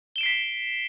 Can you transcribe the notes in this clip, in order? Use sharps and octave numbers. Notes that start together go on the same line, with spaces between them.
B6 C7 D7 E7 G7